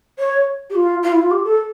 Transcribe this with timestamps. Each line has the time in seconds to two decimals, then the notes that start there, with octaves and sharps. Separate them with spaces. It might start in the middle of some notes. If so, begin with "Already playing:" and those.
0.19 C#5
0.70 G4
0.75 F4
1.03 F4
1.12 E4
1.21 F4
1.31 G4
1.44 A4